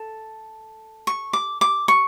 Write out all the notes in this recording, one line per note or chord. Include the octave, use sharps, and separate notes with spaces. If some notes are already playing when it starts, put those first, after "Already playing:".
Already playing: A4
C#6
D6
D6
C#6